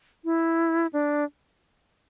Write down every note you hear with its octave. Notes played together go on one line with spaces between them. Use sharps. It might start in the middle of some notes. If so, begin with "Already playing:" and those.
E4
D4